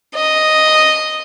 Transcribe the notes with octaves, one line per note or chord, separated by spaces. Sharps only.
D#5